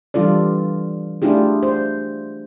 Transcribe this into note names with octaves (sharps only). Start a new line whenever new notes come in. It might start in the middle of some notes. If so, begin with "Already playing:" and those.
E3 G3 D4 F4 A4 D5
A3 D4 E4 F4 G4 G#4
C5